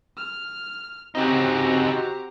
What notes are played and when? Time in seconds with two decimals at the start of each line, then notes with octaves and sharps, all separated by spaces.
0.17 F6
1.15 C#3 C4 D#4 F#4 G4 A#5